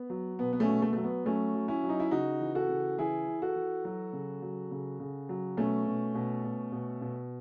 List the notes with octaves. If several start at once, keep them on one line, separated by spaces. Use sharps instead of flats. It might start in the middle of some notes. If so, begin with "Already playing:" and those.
Already playing: B3
F#3
B2 B3
B3
A3 C#4
B2
A3
F#3 A3
B3
F#3 A3 C#4
F#3
C#4 E4
F#3
D#4
E4
C#3 D#4 F#4
E3
F#4 A4
C#3
E3 E4 G#4
E3
F#4 A4
E3
F#3
C#3
F#3
C#3
C#3
F#3
B2 A3 C#4
B2
B2
B2
B2
B2